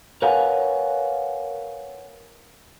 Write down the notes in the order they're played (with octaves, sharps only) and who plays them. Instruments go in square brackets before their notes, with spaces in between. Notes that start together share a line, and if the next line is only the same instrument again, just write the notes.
[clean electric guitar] A#4 B4 C#5 F5 F#5 G#5